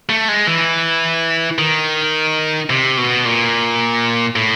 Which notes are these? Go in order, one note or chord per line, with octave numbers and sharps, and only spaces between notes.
A3
G#3
E3
D#3
C3
B2
A#2
A2